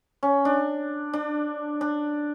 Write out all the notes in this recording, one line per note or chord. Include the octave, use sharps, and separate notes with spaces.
C#4
D4
D4
D4